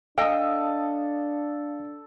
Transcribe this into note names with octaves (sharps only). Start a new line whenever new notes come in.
D4 A4 D#5 F5 G5 D#6